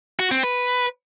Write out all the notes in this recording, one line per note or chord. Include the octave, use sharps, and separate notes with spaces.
F#4
C4
B4